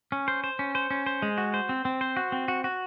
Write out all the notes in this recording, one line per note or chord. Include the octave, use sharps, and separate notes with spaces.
C#4
C5
C5
C#4
C5
C#4
C5
G#3
F#4
C5
C4
C4
C5
F#4
C4
F#4
F#4